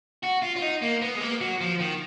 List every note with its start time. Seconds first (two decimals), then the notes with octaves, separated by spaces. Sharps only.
0.24 F#4
0.43 F4
0.56 F4
0.62 D#4
0.82 A#3
1.02 B3
1.15 G#3
1.21 A#3
1.41 F#3
1.60 F3
1.80 D#3